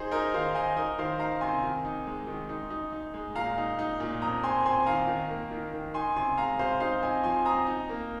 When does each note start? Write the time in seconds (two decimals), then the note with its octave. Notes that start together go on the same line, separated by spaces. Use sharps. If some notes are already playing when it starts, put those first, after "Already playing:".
Already playing: D#4 G#4 C5
0.11 D#4 A#4 D#5
0.34 D#3 C5 F5
0.55 D#3 D#5 G#5
0.77 D#4 A#4 D#5
0.99 D#3 C5 F5
1.19 D#4 F5 A#5
1.41 C3 G#5 C6
1.64 D#3
1.85 D#4
2.07 G#3
2.27 D#3
2.49 D#4
2.70 D#4
2.92 D#4
3.14 G#3
3.35 A#2 F5 A#5
3.58 D#4
3.79 D#4
4.00 A#2
4.22 F2 A#5 D#6
4.43 C4 G#5 C6
4.65 C4 G#5 C6
4.86 D#3 F5 A#5
5.08 D#3
5.30 A#3
5.51 D#3
5.73 D#3
5.94 D#4 G#5 C6
6.16 C3 G#5 C6
6.37 G#3 F5 A#5
6.59 C3 C5 F5
6.80 D#4 C5 F5
7.02 F2 D#5 G#5
7.24 F3 G#5 C6
7.45 C4 A#5 D#6
7.67 D#4
7.89 A#3